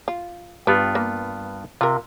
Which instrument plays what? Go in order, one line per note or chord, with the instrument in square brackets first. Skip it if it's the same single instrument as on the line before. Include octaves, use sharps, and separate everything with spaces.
[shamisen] F4
[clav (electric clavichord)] G2 B3 F4 [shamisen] G4 B4
[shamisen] A#3
[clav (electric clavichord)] C3 [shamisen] F4 A#4